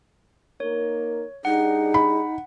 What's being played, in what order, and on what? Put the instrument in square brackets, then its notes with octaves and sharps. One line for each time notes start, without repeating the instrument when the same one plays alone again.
[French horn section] A#3 D#4 A#4 [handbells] C#5
[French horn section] G3 D4 G#4 [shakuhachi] D#4 [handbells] F#5
[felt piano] B5